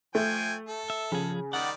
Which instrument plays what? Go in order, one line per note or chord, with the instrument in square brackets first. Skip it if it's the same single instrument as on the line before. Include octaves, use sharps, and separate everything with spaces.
[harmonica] F3 G5 G#5 [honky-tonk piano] A3
[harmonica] A4
[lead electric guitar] E5
[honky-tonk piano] C#3 [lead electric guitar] F3 G#4
[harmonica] D#3 G3 D5 [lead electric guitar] F#5